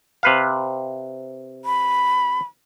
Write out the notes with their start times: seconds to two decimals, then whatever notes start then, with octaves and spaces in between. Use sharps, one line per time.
0.23 C3 B4 F5
1.65 B5